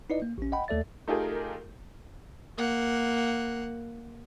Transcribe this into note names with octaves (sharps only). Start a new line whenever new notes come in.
D#4 E4 B4 D5 D#5
A#3
A1 C#4
D#5 F#5 G5 B5
D#2 A3 A4 D5 E5 A6
A3 D#4 F4 G4 G#4 A#4
A#3 F#5